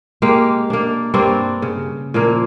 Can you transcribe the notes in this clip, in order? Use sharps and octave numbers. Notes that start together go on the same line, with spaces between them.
G#3 A#3 G4 F5
A#3 D4
G2 A#3 C4 D4
C#3
A#2 F3 A#3